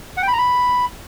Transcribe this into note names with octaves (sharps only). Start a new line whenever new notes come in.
F#5
G5
B5
A#5
B5